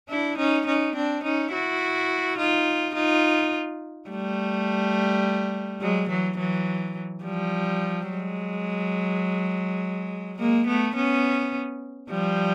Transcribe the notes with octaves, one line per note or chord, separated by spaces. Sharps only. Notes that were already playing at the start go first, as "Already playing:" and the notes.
D4 E4
C#4 D#4
C#4 D#4
C4 D4
C#4 D#4
E4 F#4
D#4 F4
D#4 F4
G3 A3
F#3 G#3
E3 F#3
E3 F#3
F3 G3
F#3 G#3
G#3 A#3
A3 B3
B3 C#4
F3 G3